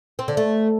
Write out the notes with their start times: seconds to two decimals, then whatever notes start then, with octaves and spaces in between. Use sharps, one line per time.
0.19 C4
0.28 D3
0.37 A3